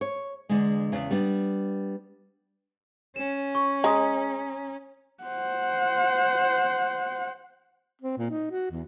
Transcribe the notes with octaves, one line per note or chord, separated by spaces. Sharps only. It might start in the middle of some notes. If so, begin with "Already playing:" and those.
C#5
E2 D3 G#3
E2 C#3
G3 B3 D4
C#4 E7
C#6
G#3 A#5 D#6
C5 F#5
C4
A#2
D#4
F#4
E2